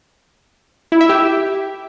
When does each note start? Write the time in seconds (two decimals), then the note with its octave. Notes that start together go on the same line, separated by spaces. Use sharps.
0.92 E4
1.01 E5
1.09 G4